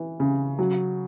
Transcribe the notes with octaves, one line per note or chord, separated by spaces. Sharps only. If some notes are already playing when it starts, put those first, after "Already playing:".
Already playing: E3
C#3
F#3